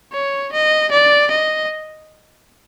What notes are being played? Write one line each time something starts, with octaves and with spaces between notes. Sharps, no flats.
C#5
D#5
D5
D#5